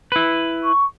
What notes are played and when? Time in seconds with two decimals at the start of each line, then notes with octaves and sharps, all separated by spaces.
0.12 E4 B4
0.63 C#6